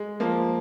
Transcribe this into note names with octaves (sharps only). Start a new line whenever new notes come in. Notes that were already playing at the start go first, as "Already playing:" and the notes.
Already playing: G#3
F3 A#3